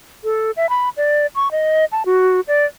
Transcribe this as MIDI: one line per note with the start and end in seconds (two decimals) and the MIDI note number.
0.24 0.51 69
0.57 0.69 76
0.69 0.89 83
0.97 1.26 74
1.35 1.51 85
1.51 1.85 75
1.92 2.03 81
2.06 2.41 66
2.48 2.66 74